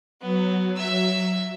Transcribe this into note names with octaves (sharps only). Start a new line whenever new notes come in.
F#3 B3
E5 E6